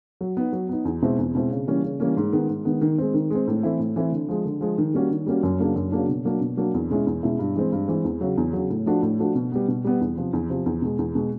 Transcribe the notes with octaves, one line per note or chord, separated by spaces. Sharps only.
F#3
B3 D#4
F#3
B3 D#4
E2
B2 G#3 C4 E4
E2
B2 G#3 C4 E4
C#3
E3 G3 A#3 C#4
C#3
E3 G3 A#3 C#4
G#2
D#3 G#3 B3
G#2
D#3 G#3 B3
D#3
G#3 C4
D#3
G#3 C4
A2
E3 A3 C4 E4
A2
E3 A3 C4 E4
D3
F3 G#3
D3
F3 G#3
D#3
G3 A#3 C#4 F#4
D#3
G3 A#3 C#4 F#4
F#2
C#3 F#3 A#3 D4
F#2
C#3 F#3 A#3 D4
B2
F#3 A#3 D4
B2
F#3 A#3 D4
E2
B2 G#3 C#4 E4
E2
B2 G#3 C#4 E4
G2
E3 G#3 C4
G2
E3 G#3 C4
E2
C#3 F#3
E2
C#3 F#3
A2
F3 A3 D4 F#4
A2
F3 A3 D4 F#4
B2
G3 B3
B2
G3 B3
E2
C3 F3
E2
C3 F3
E2
B2 G#3
E2
B2 G#3